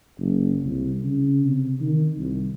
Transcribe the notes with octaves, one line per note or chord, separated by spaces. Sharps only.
F#1
C2
C#3
C3
D#3
C2